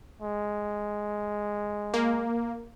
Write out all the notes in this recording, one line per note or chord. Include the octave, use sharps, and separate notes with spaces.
G#3
A#3